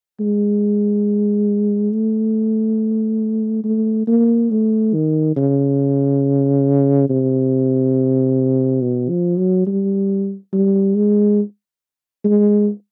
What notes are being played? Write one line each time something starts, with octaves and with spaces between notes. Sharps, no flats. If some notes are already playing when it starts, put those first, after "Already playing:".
G#3
A3
A3
A#3
A3
D#3
C#3
C3
B2
F3
F#3
G3
G3
G#3
G#3